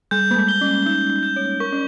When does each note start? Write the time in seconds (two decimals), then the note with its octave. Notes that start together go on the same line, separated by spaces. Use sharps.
0.11 G3 G6
0.31 A#3
0.36 G#3
0.48 G7
0.61 C#4
0.86 D#4 G6
1.23 G6
1.36 C#5
1.60 A#4 C#6
1.72 C#4